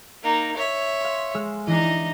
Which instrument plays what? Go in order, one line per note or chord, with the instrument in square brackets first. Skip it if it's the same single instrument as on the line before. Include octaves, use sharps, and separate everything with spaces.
[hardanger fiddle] A#3 D#4
C#5 E5
[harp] F5 C6
G#3 E6 F6
[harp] E3 D4 [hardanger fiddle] D#4 D#5